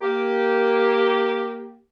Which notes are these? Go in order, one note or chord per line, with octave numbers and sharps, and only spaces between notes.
A#3 G4